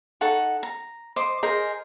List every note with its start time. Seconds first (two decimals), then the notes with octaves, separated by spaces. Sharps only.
0.21 D#4 A4 F#5 C#6
0.63 A#5
1.16 C5 D#5 D6
1.43 G#4 A#4 C5 D#5